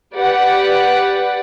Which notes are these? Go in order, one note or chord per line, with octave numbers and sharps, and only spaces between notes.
G4 B4 D5 F#5